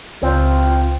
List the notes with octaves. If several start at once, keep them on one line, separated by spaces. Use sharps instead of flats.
C#2 C4 F4